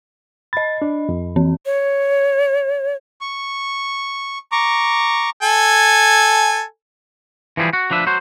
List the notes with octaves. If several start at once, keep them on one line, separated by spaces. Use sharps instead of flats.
D#5 B5 A6
D4
F2
E3 C4
C#5
C#6
A#5 C#6 D6
A4 G#5
E3 F3 G3 G#4
F#4
F3 D4 B4 E5
F#3 F#4 C5